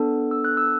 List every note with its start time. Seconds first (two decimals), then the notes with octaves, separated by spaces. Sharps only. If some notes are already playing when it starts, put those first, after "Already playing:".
Already playing: B3 D4 A4
0.31 E6
0.45 F#6
0.57 E6